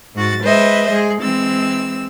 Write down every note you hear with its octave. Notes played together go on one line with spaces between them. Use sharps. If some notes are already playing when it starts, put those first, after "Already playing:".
G#2 F#4 A6
G#3 B4 C5 D#5 E5
G#3 G#4
E3 G#3 C4 E6